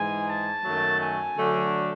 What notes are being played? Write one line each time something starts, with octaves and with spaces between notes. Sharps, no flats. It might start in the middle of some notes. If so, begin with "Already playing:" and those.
Already playing: G#2 E3 G#3 G#5
A5
F#2 D#3 F#3 A3
G#5
D3 F#3 A3 D4